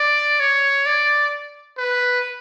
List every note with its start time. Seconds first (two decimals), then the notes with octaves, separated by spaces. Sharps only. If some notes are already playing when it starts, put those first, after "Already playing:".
Already playing: D5
0.40 C#5
0.86 D5
1.78 B4